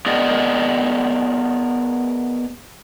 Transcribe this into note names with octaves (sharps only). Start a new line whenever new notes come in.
B3 G#4 A#4 D5 D#5